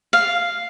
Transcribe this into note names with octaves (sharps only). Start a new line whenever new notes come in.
F5